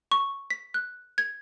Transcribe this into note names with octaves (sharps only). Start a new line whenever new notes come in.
C#6
B6
F#6
G#6